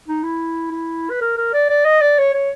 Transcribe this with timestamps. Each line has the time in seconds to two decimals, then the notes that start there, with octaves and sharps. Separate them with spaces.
0.08 D#4
0.23 E4
0.72 E4
1.10 B4
1.21 A#4
1.37 A#4
1.54 D5
1.69 D5
1.85 D#5
2.01 D5
2.18 C#5
2.34 C#5